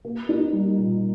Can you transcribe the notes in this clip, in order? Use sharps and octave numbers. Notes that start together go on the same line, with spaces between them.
A#3
D#4
G3
A#2